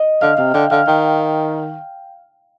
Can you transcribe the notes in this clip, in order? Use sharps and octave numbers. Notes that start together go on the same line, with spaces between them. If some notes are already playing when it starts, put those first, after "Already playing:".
Already playing: D#5
D3 F5
C3 F5
D3 G5
D3 F5
D#3 G5